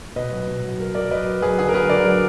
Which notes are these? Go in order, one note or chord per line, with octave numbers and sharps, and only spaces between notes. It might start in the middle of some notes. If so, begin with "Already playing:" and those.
B2 B4 D#5
F#3
B2
F#3
F#3 A#4
F#3 A#4 D5
F#3 B4 D#5
F#3
F#3 G#4 B4
D3 G#4
A#4
F#3 G#4 B4
D3 A#4 D5
F#3